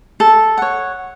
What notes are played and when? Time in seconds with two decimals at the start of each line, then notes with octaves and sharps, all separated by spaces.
0.20 A4
0.58 C#5 F#5